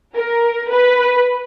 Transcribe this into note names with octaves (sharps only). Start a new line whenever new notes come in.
A#4
B4